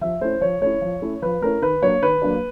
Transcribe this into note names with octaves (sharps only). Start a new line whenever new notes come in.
F3 E5
A3 C#4 E4 C5
F3 C#5
A3 C#4 E4 C#5
F3
A3 C#4 E4
F3 B4
A3 C#4 E4 A#4
D#3 B4
F#3 A#3 D4 C#5
D#3 B4
F#3 A#3 D4